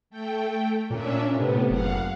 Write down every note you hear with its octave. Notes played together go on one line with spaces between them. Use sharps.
A3 G5
A#2 C#4 D4 E5
A2 C3 B3
F#1 F5 F#5